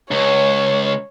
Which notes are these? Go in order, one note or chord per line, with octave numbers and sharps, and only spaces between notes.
C#2 C#5